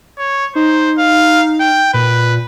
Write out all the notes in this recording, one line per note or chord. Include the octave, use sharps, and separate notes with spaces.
C#5
D#4 C5
F5
G5
A#2 B4